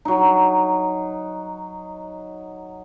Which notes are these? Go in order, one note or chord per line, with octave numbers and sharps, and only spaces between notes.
F#3 D#4